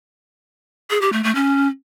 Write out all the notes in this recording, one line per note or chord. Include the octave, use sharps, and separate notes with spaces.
G#4
G4
A3
A3
C#4